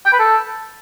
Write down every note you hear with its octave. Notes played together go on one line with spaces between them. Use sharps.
G5
B4
A4